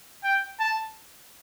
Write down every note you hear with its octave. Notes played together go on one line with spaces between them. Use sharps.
G5
A5